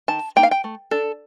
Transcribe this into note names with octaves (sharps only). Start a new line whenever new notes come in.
D#3 A5
A#3 D#4 G5
F5
G5
A3
D4 A4